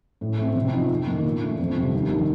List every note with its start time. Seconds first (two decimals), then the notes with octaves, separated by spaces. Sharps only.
0.21 A2
0.38 A3 C4
0.55 C3
0.73 F3 C4 D#4
0.90 F2
1.07 D#3 A#3
1.24 A#2
1.42 A3 D4
1.59 F2
1.77 C3 G3
1.94 D#2
2.10 D#3 G3 D4